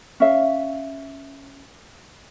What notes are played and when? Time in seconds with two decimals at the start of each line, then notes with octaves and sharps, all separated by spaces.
0.20 C#4 E5 F5